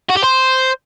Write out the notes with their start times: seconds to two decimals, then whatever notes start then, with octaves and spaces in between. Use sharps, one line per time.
0.09 F#4
0.16 G4
0.23 C5